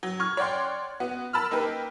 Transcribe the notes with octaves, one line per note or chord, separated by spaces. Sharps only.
F#3
C#6 F6 G#6
C#5 D5 F#5 G5 C6
B3 F#4
A#4 A5 B5 E6 F6
A#3 D#4 G4 B4